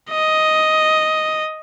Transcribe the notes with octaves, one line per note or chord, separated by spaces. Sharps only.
D#5